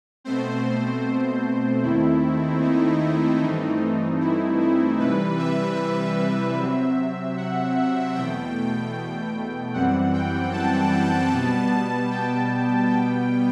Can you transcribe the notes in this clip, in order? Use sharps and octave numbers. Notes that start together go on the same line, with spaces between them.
B2 A3 C4 C5
D#2 D#3 A3 C4 E4
D#4
G2 E3 A3 C4
E4
E4
C3 E3 G3 B4
E5
C3 F#3 C4
F#5
E2 B2 A3 G5
F#2 E3 G3 C4 F#5
G5
A5
B2 G3 B3
G5
B2 G3 B3 G5